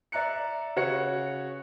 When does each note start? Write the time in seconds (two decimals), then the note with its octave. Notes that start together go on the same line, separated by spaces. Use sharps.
0.12 D5 E5 A#5 F#6 C#7
0.76 C#3 F#4 C#5 C#7